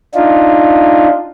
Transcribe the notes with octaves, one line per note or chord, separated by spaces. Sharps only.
D4 D#4 F4